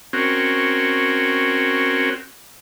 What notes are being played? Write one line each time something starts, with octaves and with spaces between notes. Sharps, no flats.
C4 C#4 F#4 A#4